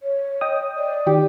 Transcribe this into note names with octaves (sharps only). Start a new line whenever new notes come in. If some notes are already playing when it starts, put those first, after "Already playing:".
C#5
D#5 G5 D#6
D5
D#3 G4